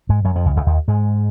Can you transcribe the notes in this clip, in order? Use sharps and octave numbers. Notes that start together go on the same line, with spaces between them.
G#2 G#3
F#2 F#3
F2 F3
C#2 C#3
C#2 C#3
D#2 D#3
G#2 G#3